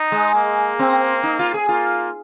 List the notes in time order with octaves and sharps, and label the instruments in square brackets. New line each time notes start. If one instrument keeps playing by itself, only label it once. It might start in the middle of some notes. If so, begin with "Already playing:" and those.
Already playing: [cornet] D#4
[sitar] G#3
[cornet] A#3
[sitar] C4
D#4
F4
G#4
[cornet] A#3 [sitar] F4